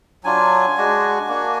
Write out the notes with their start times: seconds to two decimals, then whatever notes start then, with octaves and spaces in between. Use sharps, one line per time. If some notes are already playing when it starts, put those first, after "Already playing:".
0.24 F#3 D4 F4 G#5
0.77 G#3 D4 F#4
1.28 A#3 D4 F#4